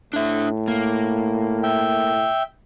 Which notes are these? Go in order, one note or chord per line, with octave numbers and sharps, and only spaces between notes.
A2 D4 E5
A#3
E5 G5